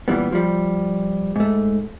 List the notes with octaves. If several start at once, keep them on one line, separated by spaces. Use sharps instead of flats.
A#2 E3 G3 B3
F3 G3
G#2 A3